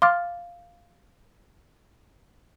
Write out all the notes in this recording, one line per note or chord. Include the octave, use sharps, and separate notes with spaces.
F5 C6 D6 F6 A6